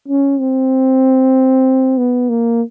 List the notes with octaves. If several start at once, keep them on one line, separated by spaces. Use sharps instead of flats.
C#4
C4
B3
A#3